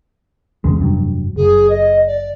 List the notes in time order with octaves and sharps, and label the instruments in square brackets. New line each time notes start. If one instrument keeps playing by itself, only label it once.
[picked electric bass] E2 C#3 G#3
F1 G2 F#3
[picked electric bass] F#1 [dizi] G#4
[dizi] D#5
D5